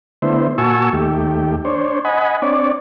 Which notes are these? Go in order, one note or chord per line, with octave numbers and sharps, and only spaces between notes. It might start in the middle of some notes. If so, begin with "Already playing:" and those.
D3 A3 B3 E4 C5
A#2 F#4 G#5 A5 C#6 E6
D#2 A3 G4
D4 C5 C#5
D#5 F#5 G#5 B5
C4 D4 C#5 D5